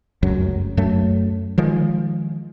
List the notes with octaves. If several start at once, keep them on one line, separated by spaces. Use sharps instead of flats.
F1 C#2 F#2 F#3
F#2 F#3 A3
D#3 F3 G#3